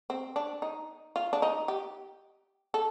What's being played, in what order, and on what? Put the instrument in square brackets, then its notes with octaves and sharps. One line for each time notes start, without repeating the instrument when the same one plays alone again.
[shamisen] C4
D4
D#4
F4
D4
D#4
G4
A4